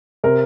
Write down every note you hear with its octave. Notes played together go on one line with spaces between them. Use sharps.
C3 A#4